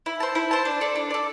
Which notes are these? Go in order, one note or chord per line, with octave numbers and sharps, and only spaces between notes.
E4
C5 A5
E4
C5 A5
D4
A4 D5
D4
A4 D5